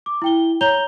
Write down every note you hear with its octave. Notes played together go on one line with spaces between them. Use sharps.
D6
E4 G5 G7
C#5 A#5 G6 F7 G7